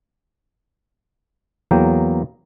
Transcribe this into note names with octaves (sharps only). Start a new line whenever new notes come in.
E2 F#3 A#3 G5